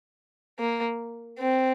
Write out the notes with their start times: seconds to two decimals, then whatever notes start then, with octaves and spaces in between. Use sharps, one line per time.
0.59 A#3
1.38 C4